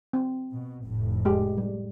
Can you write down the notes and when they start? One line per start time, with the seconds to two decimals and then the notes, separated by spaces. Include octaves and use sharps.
0.13 C4
0.53 B2
0.83 F1 A2
1.25 G#3 G4
1.58 G3